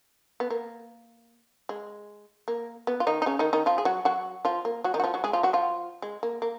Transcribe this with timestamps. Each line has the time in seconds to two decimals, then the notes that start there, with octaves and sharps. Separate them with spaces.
0.40 B3
0.50 A#3
1.69 G#3
2.48 A#3
2.87 B3
3.00 F4
3.07 D#3 D#4
3.22 D#4
3.26 C#3 C#4
3.39 D#3 D#4
3.53 D#3 D#4
3.66 F3 F4
3.78 G#4
3.85 F#3 F#4
4.05 F#3 F#4
4.45 F3 F4
4.65 A#3
4.84 F#3 F#4
4.94 D#3 D#4
5.00 F#4
5.04 F3 F4
5.14 F#3 F#4
5.24 G#3 G#4
5.33 F3 F4
5.43 F#3 F#4
5.53 F3 F4
6.02 G#3
6.23 A#3
6.42 A#3